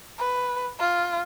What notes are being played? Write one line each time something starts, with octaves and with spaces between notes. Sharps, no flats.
B4
F4